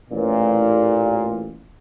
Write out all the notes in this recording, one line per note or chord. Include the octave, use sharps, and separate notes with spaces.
A1 A#2